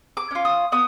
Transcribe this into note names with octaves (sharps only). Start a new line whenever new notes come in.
D6
C#4 F4
D#6
B3 D#6